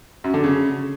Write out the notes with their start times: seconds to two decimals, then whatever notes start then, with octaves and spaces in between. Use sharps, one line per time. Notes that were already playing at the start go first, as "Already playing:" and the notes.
0.24 F#2
0.34 D3
0.44 C#3